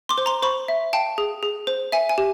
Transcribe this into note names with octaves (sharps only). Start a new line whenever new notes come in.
C6 D6
C5
A#5 C6
C5 B5 C#6
E5
F5 G5 A5
G#4
G#4
C5
E5 G#5
G#5
G4